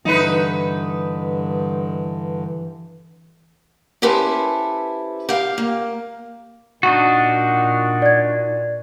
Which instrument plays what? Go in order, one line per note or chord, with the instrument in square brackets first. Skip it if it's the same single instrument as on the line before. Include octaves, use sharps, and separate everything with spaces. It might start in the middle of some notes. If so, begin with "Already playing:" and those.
[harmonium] G2 D3 [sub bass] E3 [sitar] D#4 E4 B4
[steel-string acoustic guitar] C#4 E4 G4 A4 B4 C5
G4 F5
A#3
[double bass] A#2 [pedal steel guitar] D4 D#4 F#4
[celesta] D5 G#6